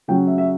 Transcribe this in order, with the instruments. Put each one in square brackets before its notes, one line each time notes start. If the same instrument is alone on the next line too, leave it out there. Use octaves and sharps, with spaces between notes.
[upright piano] C#3 F#3 C#4 G5
E5
E5